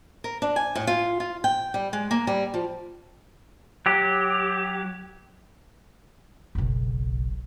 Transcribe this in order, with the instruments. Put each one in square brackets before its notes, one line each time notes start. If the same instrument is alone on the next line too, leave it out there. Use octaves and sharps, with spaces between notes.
[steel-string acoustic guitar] A#4
D4
G#5
A2
F4
F4
G5
G3
G#3
A#3
G3
F3
[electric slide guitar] F#3 G4
[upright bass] F#1 B1